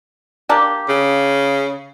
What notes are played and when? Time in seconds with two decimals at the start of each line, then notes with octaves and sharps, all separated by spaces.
0.49 A#3 D4 G4
0.89 C#3